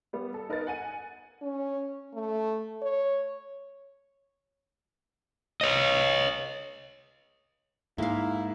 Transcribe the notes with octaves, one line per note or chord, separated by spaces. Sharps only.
G3 B3
A4
D#4 A#4 B4 D#5 A6
F#5 G#5 D#7
C#4
A3
C#5
C#5 D#5
G#2 A#3 E4 F5